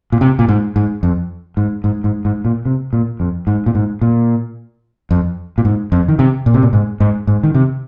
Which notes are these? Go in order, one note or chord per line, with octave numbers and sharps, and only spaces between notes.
A#2
C3
A#2
G#2
G#2
F2
G#2
G#2
G#2
G#2
A#2
C3
A#2
F2
G#2
A#2
G#2
A#2
F2
A#2
G#2
F2
D#3
C3
A#2
C3
A#2
G#2
G#2
G#2
D#3
C3